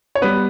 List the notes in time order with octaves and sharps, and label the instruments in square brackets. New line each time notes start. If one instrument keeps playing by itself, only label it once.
[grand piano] C#5
G3 B3 B4